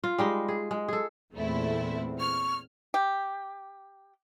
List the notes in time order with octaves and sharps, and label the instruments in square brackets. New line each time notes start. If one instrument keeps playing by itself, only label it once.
[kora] F4
G3 G#3 D#4
G#4
G#3
G#4 A4
[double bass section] E2 A#2 C4 [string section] A3 E4
[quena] C#6 [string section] F6
[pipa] G4